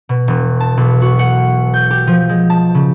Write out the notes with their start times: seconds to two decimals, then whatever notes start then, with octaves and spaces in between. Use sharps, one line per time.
0.09 B2
0.28 E1
0.60 A5
0.77 B1
1.02 F#4
1.19 F#5
1.74 G6
1.90 G4
2.07 F3
2.29 G#3
2.50 A5
2.75 C#3